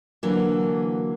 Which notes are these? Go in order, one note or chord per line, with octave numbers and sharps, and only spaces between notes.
D3 E3 F#3 A#3